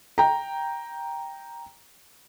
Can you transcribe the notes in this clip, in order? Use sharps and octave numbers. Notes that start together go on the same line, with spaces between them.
G5 A#5